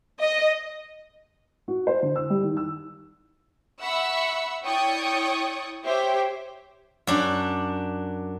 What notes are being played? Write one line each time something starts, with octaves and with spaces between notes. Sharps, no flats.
D#5
F#4
C5
D3
E6
G3
D#3
E6
E5 F#5 B5 C#6 E6
E4 C#5 D5 G5 C#6 D#6
G4 C5 C#5 E5 G5
F#2 D4